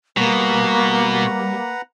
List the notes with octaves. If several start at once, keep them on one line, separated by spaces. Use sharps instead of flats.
B2 G3 A#3 B4 F#5 A#5